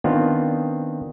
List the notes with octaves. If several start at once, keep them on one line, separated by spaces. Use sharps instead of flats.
D#3 B3 C4 D4 F4